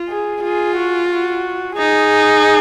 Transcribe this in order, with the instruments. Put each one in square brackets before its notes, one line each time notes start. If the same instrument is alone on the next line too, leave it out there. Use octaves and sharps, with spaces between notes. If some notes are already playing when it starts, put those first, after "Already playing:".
Already playing: [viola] F4
[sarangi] G#4
[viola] F4 [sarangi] G#4
[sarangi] F#4
F#4
[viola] D#4 [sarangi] G#4